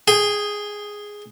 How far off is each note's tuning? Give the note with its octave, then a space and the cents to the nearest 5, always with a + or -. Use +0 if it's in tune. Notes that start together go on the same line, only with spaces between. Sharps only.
G#4 +0 G5 +30